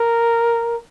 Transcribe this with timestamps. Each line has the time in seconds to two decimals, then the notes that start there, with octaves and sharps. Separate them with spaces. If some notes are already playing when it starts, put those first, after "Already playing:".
Already playing: A#4